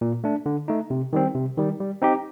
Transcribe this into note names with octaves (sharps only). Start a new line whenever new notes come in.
A#2
A3 D4
D3
A3 D#4
C3
D#3 G3 C4
C3
D#3 G3
G3
C4 D#4 G4